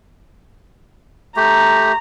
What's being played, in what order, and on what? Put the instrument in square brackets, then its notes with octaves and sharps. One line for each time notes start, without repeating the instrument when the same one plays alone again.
[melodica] A3 G4 [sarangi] A#5